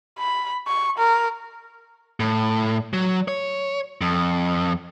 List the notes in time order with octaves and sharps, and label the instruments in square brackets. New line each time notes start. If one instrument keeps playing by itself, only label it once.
[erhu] B5
C#6
A#4
[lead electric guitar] A2
F#3
C#5
F2